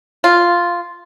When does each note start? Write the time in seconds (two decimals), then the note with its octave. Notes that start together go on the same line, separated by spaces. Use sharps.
0.24 F4